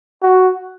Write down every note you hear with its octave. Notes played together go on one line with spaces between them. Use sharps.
F#4